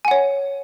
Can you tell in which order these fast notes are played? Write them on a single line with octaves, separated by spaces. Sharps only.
G#5 F#5 C#5